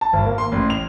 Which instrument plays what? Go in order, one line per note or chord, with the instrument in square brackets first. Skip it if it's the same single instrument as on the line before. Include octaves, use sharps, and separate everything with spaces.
[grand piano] A5
G#1
A#3
C6
A1
F7